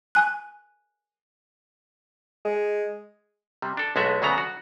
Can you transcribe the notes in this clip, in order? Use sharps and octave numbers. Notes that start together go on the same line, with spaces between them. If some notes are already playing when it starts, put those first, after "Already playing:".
G#5 F#6
G#3
C3 G3
D4 A4
B1 G#3 A3 F#4 E5
D2 C#3 F#3 B3 F#4 A#5
F#4